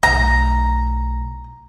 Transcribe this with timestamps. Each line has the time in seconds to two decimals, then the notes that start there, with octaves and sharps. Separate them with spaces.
0.03 B1 A2 A#5